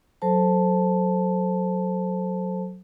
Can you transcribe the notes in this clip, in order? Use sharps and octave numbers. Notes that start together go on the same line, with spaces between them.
F#3 A4 C5 A5